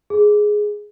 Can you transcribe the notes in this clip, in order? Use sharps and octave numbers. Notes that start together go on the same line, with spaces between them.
G#4